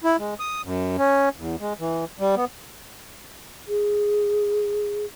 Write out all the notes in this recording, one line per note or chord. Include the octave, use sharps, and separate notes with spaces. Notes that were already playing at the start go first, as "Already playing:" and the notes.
E4
G#3
D#6
F#2
C#4
E2
G#3
E3
G3
B3
G#4